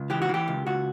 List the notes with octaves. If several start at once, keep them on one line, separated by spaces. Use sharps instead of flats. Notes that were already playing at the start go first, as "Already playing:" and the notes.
Already playing: C#2
E3 G4
F#4
E3 G4
C#2
C#2 F#4